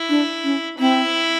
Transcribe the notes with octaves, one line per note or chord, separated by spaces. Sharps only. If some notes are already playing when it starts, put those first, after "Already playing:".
Already playing: E4
D4
C#4
C4 E4